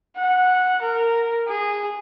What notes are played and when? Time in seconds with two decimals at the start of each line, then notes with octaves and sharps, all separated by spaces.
0.17 F#5
0.82 A#4
1.48 G#4